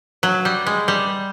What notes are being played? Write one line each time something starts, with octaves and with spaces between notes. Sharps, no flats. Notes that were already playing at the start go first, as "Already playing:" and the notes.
F#3
G3
G#3
G3